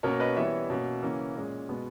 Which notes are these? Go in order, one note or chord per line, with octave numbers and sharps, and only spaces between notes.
B2 A#3 C#4 A#4 C#5
B4 D#5
E3 G3 B3 C#5 E5
B2 A#3 C#4
C#3 E3 A#3 C#4
A#2 G#3 C#4
B2 G#3 B3